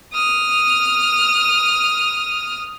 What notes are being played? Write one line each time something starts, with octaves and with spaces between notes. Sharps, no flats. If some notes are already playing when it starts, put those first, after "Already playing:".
D#6 F6